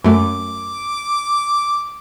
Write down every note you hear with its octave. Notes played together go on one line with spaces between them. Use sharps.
F#2 A3 D6